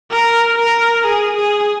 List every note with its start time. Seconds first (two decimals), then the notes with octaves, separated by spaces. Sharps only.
0.11 A#4
0.58 A#4
1.05 G#4
1.37 G#4